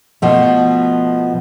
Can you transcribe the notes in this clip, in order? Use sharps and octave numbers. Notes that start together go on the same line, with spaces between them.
B2 F3 A3